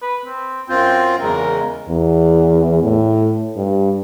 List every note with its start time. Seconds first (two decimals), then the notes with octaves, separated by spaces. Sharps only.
0.02 B4
0.26 C4
0.69 F#2 C4 F4 G5
1.22 E2 C#3 G#3 A#4
1.89 E2
2.83 A2
3.57 G2